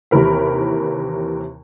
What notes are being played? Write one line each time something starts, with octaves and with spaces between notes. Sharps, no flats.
D#2 C3 E3 A#4 B5